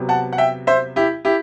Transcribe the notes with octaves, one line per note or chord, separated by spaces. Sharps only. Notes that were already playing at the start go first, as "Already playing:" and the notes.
Already playing: C3 F#3 B3
F#5 A5
F#5
E5 G5
C5 E5
E4 G4
E4 G4